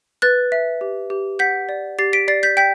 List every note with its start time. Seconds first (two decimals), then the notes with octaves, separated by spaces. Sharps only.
0.22 B4 F#6 A6
0.52 E5
0.81 G4
1.10 G4
1.39 F#5 G6 B6
1.69 D5
1.99 G4 A6 C7
2.13 B6 D7
2.28 D5 A6 C7
2.43 G6 B6
2.57 G5 G6 B6